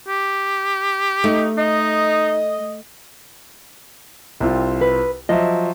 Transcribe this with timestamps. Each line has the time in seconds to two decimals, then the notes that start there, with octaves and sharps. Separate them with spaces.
0.08 G4
1.24 A3 D#4
1.57 D#4 D#5
4.40 C2 C4 F4
4.81 B4
5.29 F3 F#3 D#5 E5